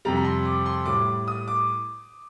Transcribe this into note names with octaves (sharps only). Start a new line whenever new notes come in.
F2 C3 G3 A#5
A#5
C6
D6
C6
A2 G3 D6
D#6
D6